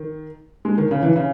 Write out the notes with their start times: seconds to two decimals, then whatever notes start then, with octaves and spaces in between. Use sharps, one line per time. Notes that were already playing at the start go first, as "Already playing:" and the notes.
Already playing: D#3
0.65 G#3
0.78 D#3
0.91 C#3
1.03 E3
1.16 C#3